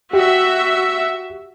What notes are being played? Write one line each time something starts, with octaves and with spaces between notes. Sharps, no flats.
F#4 G4 E5